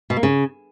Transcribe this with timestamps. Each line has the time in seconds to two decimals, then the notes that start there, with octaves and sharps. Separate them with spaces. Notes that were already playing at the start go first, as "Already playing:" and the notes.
0.10 B2
0.17 A#3
0.23 C#3